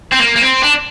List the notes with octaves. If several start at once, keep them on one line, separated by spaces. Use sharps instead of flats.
C4
A#3
A#3
C4
D4